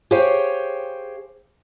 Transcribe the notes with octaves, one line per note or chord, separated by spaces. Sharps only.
G4 G#4 C5 C#5 F5 G5